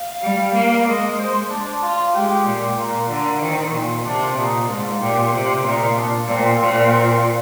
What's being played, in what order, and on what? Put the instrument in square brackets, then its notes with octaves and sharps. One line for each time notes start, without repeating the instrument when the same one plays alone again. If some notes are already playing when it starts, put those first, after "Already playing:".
Already playing: [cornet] F5
[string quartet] G3
A#3
[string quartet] G#3 [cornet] D#5
[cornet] C5
D4
F4
[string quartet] G#3 [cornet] G4
[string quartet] A#2
[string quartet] A#2 [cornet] A#3
[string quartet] D3 [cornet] A#3
[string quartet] D#3 [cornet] C4
[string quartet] A#2
[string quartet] C3 [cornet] D4
[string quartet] A#2 [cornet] D#4
[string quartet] G#2 [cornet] F4
[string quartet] A#2 [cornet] G4
[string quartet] C3 [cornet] G4
[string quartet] A#2 [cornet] D#4
[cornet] D4
[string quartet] A#2 [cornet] C4
[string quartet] A#2 [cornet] C4